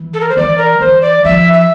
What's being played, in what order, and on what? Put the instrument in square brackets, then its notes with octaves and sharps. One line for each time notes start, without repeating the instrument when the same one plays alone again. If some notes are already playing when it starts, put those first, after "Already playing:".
Already playing: [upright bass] E3
[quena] A4
A#4
C5
[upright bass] E3 [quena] D5
[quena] A#4
[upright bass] E3 [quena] C5
[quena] D5
[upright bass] F3 [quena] E5
[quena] E5